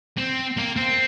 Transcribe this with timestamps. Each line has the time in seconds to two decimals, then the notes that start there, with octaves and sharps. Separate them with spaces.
0.18 C4
0.57 A#3
0.77 C4